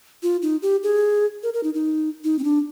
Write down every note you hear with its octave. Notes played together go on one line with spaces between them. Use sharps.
F4
D#4
G4
G#4
A#4
A#4
D#4
D#4
D#4
C4
D4